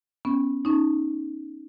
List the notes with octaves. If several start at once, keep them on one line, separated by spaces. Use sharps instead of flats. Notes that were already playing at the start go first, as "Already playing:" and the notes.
B3 C#4
C#4 D#4